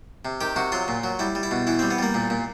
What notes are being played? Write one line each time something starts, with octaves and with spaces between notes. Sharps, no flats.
C3
D#3 G4
C3 F#4
F#3 F4
A#2
F#3
G3 E4
G3
E4
B2
E3 E4
G3 C4
B3
G3 A#3
A#2
A#2